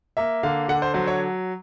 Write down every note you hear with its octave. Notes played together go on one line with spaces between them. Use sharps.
A#3 E5
D3 F5
D3 F#5
C5
F#3 C5
C#5